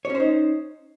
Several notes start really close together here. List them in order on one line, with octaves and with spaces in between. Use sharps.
C#5 C#4 C5 D#4